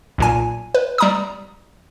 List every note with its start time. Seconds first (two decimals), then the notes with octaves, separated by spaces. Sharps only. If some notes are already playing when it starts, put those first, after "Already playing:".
0.18 B1 A#2 G#5
0.74 B4
0.98 G3 A#5 D#6